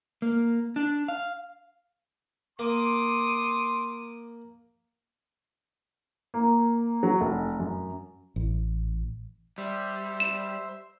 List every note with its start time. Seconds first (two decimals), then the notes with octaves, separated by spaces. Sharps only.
0.22 A#3
0.76 D4
1.08 F5
2.59 A#3 C6 D6 D#6
6.34 A#3
7.03 F#3
7.21 F1
7.59 F#2
8.36 A1
9.58 G3 C5 E5
10.20 E7